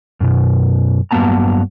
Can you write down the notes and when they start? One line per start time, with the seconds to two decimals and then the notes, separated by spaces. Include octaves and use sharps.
0.20 F#2 B2
1.11 G2 F#3 A#3 B3 A5 A#5